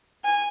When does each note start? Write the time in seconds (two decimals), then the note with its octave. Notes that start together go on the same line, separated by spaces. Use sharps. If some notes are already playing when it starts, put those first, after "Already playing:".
0.25 G#5